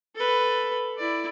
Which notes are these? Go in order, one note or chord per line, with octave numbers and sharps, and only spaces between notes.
A4 B4
E4 D5